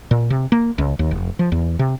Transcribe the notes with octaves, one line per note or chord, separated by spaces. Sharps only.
A#2
C3
A#3
C#2
D#2
F1
F3
E2
C3